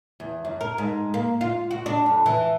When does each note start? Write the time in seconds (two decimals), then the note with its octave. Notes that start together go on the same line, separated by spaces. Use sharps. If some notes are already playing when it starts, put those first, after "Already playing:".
0.20 E2
0.45 F#2
0.61 A#4
0.78 G#2
1.14 A#3
1.41 F4
1.71 F#4
1.86 D4
2.06 F2
2.26 E3